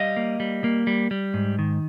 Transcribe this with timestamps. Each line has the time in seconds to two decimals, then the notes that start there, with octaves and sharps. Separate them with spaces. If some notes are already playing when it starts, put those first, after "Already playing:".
Already playing: G3 D#5 F5
0.17 A#3
0.40 G3
0.64 A#3
0.87 G3
1.11 G3
1.34 G#2
1.59 D#3